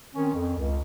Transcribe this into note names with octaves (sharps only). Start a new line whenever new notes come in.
D#3 C4 C#4
F2
C#2